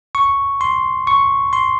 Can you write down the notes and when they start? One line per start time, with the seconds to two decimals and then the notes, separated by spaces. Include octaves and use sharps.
0.15 C#6
0.61 C6
1.07 C#6
1.53 C6